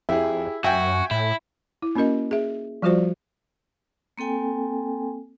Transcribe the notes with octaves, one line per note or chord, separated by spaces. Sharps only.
F2 E4 G4 G#4
F#2 F#4 E5 G5 G#5
A2 E4
E4
A#3 C#4 F#4 A#4 D#5
G#4 E5
F3 G3 F4 F#4 C5 D5
A#3 C4 A4 G5 G#5